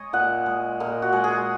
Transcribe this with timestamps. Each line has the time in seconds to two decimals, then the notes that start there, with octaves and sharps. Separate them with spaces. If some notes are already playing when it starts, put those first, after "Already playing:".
Already playing: G#3 C#5 D#5
0.13 A#2 F#5
0.46 G#3
0.80 A#2 A#4
1.02 F#4
1.13 G#3
1.24 G#4